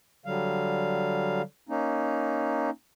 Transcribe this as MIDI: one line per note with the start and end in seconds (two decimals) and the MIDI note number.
0.26 1.42 50
0.26 1.42 54
0.26 1.42 55
0.26 1.42 77
1.69 2.70 58
1.69 2.70 61
1.69 2.70 63